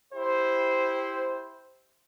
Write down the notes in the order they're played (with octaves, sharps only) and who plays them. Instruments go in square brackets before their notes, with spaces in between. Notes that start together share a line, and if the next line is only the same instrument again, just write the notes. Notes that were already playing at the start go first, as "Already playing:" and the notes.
[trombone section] E4 G4 C5